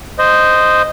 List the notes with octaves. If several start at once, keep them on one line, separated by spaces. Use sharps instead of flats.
C5 D#5